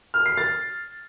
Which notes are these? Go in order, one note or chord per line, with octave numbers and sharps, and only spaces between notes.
F6
C7
A6